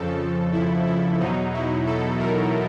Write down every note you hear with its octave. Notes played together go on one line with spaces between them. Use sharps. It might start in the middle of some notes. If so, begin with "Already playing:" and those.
Already playing: F2 C#3 F3 A4
E4
E4
E2 B2 F#3 D#4
E4
A4
A#4